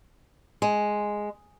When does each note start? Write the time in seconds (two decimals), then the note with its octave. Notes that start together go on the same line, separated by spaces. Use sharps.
0.62 G#3